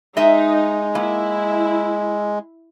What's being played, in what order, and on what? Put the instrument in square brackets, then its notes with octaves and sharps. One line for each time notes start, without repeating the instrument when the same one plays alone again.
[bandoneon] G#3 [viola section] D#4 [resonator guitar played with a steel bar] D#5 E5
[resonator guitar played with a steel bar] A#3 [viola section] E4